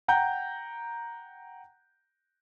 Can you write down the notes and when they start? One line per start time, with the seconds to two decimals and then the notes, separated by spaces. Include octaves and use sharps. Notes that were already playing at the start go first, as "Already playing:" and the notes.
0.08 F#5 G5 A#5 G6